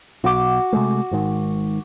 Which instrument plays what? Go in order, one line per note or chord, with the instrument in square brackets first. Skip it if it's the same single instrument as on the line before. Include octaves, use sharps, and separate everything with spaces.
[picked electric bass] B1 [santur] F#4 D6
[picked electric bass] C3 G#3 A3
G#1 G#2 D#3